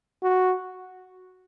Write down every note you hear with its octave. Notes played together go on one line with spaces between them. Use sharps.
F#4